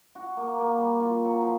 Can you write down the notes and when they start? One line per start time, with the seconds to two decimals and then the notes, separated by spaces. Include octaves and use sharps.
0.15 F#4
0.37 A#3
0.58 A#3
0.77 G3
1.00 F4
1.25 F#3
1.41 F3